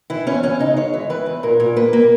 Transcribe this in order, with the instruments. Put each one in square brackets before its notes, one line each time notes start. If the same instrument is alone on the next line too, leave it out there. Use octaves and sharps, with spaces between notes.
[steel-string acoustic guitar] E3 E4
E2 C#4
E2 C#4
C#3 D#4
G#3 C#5
E3
E3 B4
E2
A#2 A#4
A#2
A#3 B4
A#3